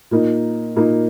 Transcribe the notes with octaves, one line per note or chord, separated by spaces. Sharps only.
A#2 A#3 D#4
A#2 A#3 D#4